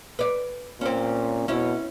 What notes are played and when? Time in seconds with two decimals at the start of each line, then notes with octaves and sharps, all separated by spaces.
0.19 B4 D5
0.81 A#2 C4 C#4
1.48 B2 C#4 E4